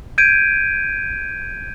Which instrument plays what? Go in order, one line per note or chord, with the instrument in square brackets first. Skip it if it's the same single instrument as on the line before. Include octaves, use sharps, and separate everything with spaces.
[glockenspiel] G6 G#6 D7 D#7